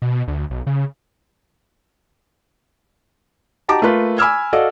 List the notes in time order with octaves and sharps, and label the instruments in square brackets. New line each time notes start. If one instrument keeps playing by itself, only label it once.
[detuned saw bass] B2
D2
B1
C#3
[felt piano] D#4 F#4 G4 A5 A#5 D6
A3 A#3 F4 B4
G#5 B5 D6 E6 F6 G#6
F#4 A4 D5 D#5 F5